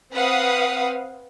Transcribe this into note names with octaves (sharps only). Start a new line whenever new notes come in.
C4 B4 C5 F5 F#5 D#6